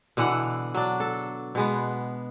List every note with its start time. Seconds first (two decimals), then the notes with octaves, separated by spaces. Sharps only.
0.17 B2 D3 E3 F#5
0.75 F#3 D4
1.00 A4
1.55 B2 G#3 B3